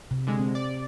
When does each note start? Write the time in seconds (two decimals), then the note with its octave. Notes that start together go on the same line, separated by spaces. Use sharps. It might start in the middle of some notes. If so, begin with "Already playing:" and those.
0.11 C3
0.27 D3 G#3
0.39 C4
0.55 D5